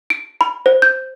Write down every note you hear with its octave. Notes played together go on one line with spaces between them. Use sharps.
D7
B5
C5
G6